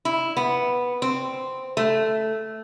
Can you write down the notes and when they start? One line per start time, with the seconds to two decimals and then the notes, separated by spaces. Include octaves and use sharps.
0.05 E4
0.37 B3
1.02 C4
1.77 A3